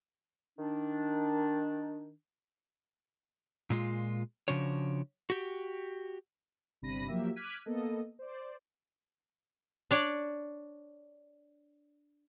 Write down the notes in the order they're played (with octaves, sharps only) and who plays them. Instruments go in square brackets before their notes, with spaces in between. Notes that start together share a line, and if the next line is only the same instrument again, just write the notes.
[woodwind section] D#3 D4
[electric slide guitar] A#2 G#3 F4
C#3 F3 D4 F#4 C#5
F#4 G4
[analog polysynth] G1 C3 D4 B5 A#6 D#7
F3 F#3 A#3 G4 E5
D6 F6 F#6 G#6 B6 D#7
A#3 B3 A4 D#5
C5 D5
[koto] D4 C#5 D5